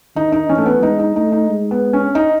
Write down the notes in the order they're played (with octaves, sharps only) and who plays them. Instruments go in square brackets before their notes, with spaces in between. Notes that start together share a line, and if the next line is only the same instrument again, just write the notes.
[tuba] D#3 [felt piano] D#4
[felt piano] D#4
[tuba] E3 [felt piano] C#4
[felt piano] A3
B3
[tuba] G#3 [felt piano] D#4
[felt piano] D#4
[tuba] A3 [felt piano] D#4
[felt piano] D#4
[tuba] G#3
[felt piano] B3
C#4
D#4